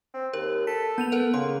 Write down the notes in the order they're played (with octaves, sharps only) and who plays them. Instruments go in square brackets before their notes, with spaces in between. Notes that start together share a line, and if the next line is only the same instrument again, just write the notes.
[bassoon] C4
[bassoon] D#2 [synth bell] A#4
[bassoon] A4 [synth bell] B6
[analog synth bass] B3 [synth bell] G6 D#7 F7
[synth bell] A4 A#4 F#5
[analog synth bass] C#3 [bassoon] A#3 [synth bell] C6